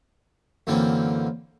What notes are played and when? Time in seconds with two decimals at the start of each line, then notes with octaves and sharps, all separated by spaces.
0.67 F#2 D3 E3 A#3 C4